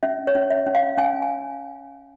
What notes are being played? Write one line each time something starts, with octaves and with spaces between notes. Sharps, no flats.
C#4 E5
C#5
C#4
E5
C#4
F5
C#4 G#5
G#5